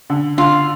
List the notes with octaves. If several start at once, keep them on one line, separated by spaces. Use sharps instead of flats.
D3
D3 F4